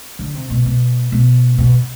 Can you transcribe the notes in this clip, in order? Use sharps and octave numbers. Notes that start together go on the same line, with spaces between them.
D3
C3
B2
B2
B2
B2